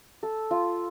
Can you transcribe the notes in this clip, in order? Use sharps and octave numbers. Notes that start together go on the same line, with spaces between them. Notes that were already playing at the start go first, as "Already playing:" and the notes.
A4
F4